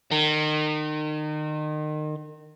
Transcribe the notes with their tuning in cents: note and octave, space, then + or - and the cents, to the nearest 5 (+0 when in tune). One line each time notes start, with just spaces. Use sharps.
D#3 -30